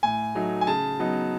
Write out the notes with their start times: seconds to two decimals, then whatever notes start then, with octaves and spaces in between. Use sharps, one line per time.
0.03 A2 G#5
0.35 F#3 A3 D#4
0.61 G#5
0.67 C#3 A5
0.99 F#3 B3 D#4